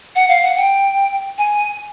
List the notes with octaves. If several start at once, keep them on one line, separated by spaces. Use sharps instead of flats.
F#5
F5
F#5
G5
G#5